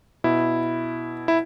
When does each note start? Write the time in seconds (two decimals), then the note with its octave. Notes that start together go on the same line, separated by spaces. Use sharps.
0.24 B2 E4
1.28 E4